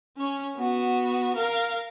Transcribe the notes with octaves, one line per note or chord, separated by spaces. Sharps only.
C#4 C#5
B3 F#4
A#4 F5